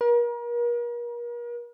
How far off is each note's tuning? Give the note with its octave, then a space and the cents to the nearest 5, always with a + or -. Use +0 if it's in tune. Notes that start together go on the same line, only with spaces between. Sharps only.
A#4 +40